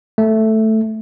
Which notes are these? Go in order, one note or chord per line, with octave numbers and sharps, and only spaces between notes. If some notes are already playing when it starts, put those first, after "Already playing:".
A3